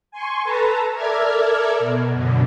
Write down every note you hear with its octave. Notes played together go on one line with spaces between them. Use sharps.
G#5 C6 C#6
A4 B4 A5 A#5
A4 A#4 D5 E5 F6 G#6
B2
F#2 B2 D3